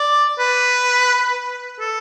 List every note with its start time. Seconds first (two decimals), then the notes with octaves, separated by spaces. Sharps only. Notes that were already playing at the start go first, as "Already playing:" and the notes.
Already playing: D5
0.40 B4
1.81 A4